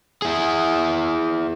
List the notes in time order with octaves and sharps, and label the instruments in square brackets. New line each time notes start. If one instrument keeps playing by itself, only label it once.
[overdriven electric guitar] E4 G#4